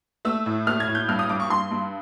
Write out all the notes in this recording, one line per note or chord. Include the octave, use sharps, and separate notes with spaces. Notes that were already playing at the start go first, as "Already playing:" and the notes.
A3 E6
A2
A3 F6
G#6
A2
G6
G2 F6
D#6
G2 D6
C#6
G2 C6
G2